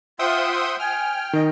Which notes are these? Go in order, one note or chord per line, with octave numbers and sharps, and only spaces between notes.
F4 C5 E5 F#5 G5 C6 D#6
G5 G#5 F6
D#3 D#5